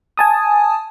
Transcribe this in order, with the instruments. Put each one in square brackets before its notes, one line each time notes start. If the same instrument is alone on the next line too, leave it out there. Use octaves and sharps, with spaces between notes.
[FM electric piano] G#5 A5 D#6